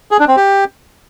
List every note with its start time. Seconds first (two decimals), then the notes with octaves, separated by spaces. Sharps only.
0.11 G#4
0.20 D4
0.28 C4
0.37 G4